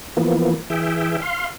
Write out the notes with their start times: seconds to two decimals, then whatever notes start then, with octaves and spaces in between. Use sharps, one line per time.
0.17 E3 F3 A#3 B3
0.70 E3 G#4 E5 G5
1.22 F5 C6